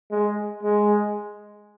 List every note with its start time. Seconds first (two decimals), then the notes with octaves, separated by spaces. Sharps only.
0.11 G#3
0.63 G#3